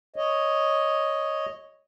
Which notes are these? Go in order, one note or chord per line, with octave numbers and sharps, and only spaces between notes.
C#5 D#5